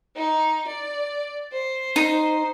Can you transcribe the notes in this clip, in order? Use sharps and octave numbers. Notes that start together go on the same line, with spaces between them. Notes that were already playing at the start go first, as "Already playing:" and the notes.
D#4
D5
C5
D#4